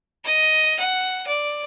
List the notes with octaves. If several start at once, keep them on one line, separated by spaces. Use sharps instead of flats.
D#5
F#5
D5